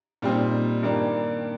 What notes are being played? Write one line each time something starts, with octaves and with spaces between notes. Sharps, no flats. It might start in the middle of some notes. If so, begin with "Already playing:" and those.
A#2 G3 C4 D#4
G2 D#3 A#3 D4